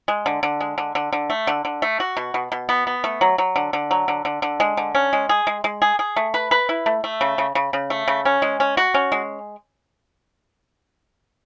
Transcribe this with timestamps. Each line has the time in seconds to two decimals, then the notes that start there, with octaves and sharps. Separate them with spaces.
0.08 G#3
0.26 D3
0.43 D3
0.61 G#3
0.78 D3
0.95 D3
1.13 D3
1.30 A3
1.47 D3
1.65 D3
1.82 A3
2.00 F#4
2.17 B2
2.34 B2
2.52 B2
2.69 B3
2.87 B3
3.04 A3
3.21 F#3
3.38 F#3
3.56 D3
3.73 D3
3.91 F#3
4.08 D3
4.25 D3
4.42 D3
4.60 G#3
4.77 D3
4.95 C#4
5.13 G#3
5.29 G#4
5.47 G#3
5.64 G#3
5.82 G#4
5.99 G#4
6.16 A3
6.34 B4
6.51 B4
6.69 E4
6.86 A3
7.04 A3
7.21 C#3
7.38 C#3
7.55 C#3
7.73 C#3
7.90 A3
8.08 C#3
8.25 C#4
8.42 G#3
8.60 C#4
8.77 F#4
8.94 C#4
9.12 G#3